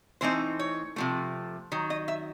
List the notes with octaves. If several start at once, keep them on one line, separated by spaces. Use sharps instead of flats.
E3 A3 C4 D#4 C5
C#5
C3 F3 A3
D#3 F#3
D#5
E5